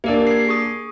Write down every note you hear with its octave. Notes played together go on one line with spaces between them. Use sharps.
A#3 D4 G4 A#4
G#6 C7
G#4 C#6 D#6